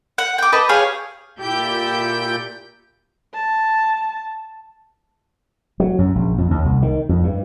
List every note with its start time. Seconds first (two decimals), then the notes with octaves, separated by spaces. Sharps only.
0.18 F#5
0.38 G5 D6
0.53 B4 D#5 A5
0.69 G4 G#4 C#5 F5
1.39 A#2 E4 G4 A4 G5 G6
3.34 A5
5.80 F#3
5.99 F#2
6.15 A#1
6.38 F2
6.51 D#2
6.65 C2
6.82 D#3
7.09 F2
7.24 G2